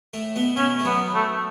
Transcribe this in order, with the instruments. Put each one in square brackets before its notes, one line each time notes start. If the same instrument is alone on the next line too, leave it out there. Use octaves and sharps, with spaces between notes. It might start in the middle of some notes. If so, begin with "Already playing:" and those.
[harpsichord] A2 A3
B2 B3
[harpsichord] B2 B3 [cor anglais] C#4
[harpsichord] A3
[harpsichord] F#2 F#3 [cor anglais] B3
[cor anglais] A3